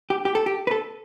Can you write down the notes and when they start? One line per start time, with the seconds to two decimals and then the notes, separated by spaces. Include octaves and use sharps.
0.10 G4
0.25 G4
0.35 A4
0.46 G4
0.67 B4
0.71 A4